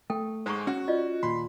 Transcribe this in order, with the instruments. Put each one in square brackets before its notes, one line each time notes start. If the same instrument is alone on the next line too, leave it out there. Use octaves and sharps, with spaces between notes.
[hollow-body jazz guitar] A3 [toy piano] A4 G5
[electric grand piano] G#2 G#3 [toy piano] C5 A#5 C#6
[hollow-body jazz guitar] C#4 F#5 [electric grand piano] F#4
[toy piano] F4 D5 D#5
[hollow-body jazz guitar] D#2 A#2 [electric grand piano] B5 C6